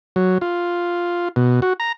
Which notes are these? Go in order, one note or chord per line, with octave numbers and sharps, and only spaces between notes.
F#3
F4
B2
F#4
A#5